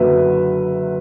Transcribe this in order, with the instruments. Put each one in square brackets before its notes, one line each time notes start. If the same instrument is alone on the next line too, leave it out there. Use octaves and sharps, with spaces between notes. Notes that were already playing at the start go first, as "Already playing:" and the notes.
Already playing: [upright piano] F#1 F#2 D3 F#3 B4 E5